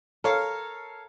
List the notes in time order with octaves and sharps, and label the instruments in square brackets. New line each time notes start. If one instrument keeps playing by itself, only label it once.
[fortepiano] A4 C#5 F5 [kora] A#4